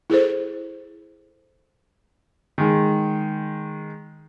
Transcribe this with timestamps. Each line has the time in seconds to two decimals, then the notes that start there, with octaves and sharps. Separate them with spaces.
0.10 E4 G#4 A4 C5
2.58 D#3 G#3